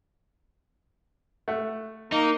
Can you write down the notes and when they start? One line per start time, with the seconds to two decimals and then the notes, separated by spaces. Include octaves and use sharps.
1.48 A3 F#5
2.12 A#3 D#4